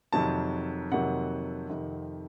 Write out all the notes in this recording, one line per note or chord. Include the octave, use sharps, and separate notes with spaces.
F2 C3 D#3 F#3 A#3 A5
F2 C3 D#3 F#3 A#3 F#5
F2 C3 D#3